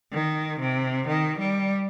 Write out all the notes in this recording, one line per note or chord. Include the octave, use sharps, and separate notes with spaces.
D#3
C3
D#3
G3